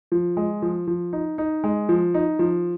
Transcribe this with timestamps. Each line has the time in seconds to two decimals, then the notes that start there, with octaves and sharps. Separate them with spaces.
0.12 F3
0.37 G#3
0.62 F3
0.87 F3
1.13 D#4
1.38 D#4
1.64 G#3
1.89 F3
2.14 D#4
2.39 F3